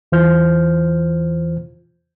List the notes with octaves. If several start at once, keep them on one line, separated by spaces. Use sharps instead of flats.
E2 E3 F4 C5 F6 G6